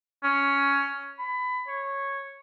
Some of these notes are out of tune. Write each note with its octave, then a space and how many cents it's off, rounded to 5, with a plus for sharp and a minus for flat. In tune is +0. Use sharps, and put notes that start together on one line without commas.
C#4 +10
B5 +25
C#5 -10